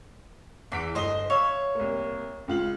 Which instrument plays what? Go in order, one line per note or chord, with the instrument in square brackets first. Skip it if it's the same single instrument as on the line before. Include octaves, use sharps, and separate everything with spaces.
[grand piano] E2 B6 D7 [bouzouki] E3
[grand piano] G1 G7 [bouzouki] C5 D#5
[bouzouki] C#5 E5 [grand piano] F5
[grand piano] C2 A#3
C#2 F4 F#7